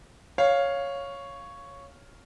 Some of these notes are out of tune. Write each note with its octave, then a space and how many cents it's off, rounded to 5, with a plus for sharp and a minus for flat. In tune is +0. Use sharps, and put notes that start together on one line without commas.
C#5 +0 F5 +0